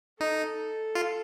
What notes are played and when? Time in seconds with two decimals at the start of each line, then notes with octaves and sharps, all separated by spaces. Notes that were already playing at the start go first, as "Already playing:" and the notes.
0.20 D#4 A4
0.95 F4